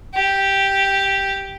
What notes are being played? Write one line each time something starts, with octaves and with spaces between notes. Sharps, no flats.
G4